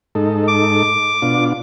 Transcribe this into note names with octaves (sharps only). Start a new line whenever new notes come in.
G#2 D#4 A4
D6
B2 D4 F4